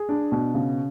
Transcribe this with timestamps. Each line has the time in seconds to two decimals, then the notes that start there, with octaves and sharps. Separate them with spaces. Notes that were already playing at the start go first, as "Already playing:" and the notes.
Already playing: G#4
0.09 D4
0.32 B2
0.54 C#3